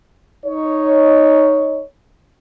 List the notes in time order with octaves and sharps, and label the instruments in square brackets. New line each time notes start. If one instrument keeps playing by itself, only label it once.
[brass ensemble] D#4 C#5